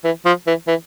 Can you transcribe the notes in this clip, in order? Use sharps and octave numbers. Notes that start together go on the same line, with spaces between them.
E3
F3
E3
E3